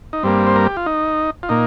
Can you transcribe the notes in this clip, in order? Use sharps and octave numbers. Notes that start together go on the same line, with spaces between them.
D#4
G2 G3 A#3 C4
C5
A#4
G4
F4
D#4
F4
A#2 A#3 D#4